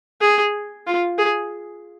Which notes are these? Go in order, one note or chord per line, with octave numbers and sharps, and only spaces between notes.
G#4
F4
G#4